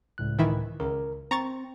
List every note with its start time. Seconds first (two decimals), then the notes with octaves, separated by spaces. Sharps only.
0.18 C#2 A2 F#6
0.39 D#3 E3 E4
0.80 C#2 A#4
1.31 C4 A#5 C#6 A6